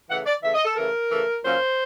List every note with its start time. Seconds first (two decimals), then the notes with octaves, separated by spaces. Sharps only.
0.10 C#3 E3 A3 F#5
0.26 D5
0.43 C#3 E3 A3 E5
0.54 D#5
0.65 A4
0.77 C#3 E3 A3 A#4
1.10 C#3 E3 A3
1.43 A#2 F#3 A#3 C#4 C5